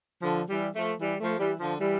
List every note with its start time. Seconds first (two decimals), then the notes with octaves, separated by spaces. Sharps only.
0.21 D3 F3
0.48 E3 G3
0.74 F3 A3
1.00 E3 G3
1.20 F3 A3
1.39 E3 G3
1.60 D3 F3
1.79 E3 G3